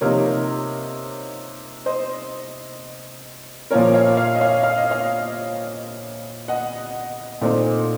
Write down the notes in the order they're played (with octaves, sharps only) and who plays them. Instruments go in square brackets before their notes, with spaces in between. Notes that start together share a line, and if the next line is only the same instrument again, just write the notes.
[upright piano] C3 F3 A#3 D#4 A#4 C#5
C5 D#5
A#2 F3 A#3 C#4 A#4 C#5
C#5 F5
C#5 F5
D#5
C#5 F5
F5
D#5
C#5 F5
D#5 F#5
A#2 A3 C4 D#4